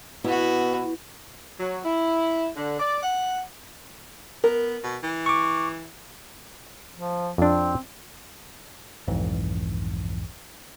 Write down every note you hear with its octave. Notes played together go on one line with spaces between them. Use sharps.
B2 B3 E4 F#4
F#3
E4
D3
D5
F#5
B3 A#4
B2
E3
C#6 D6
F3
F2 C4 D4
B1 F2 G#2 E3